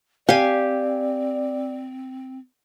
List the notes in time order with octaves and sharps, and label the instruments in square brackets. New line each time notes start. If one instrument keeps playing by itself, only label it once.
[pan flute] C4 [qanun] G4 G#5 [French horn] D5 [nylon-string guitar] F5